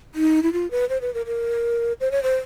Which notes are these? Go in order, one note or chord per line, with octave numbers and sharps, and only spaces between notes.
D#4
E4
F4
B4
C5
B4
A#4
A#4
C5
C#5
C5